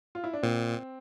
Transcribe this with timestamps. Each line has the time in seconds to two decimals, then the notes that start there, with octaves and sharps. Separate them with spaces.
0.15 F4
0.24 E4
0.33 D4
0.43 A#2 C4